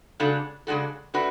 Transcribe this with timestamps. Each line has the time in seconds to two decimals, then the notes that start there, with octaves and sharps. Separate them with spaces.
0.20 C#3 G#3 D4 F#4 A4
0.67 C#3 G#3 D4 F#4 A4
1.14 A3 D4 F#4 B4